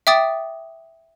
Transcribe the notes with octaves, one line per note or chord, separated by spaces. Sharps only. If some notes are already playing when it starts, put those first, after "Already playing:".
E5 G5 D6 D#6 A6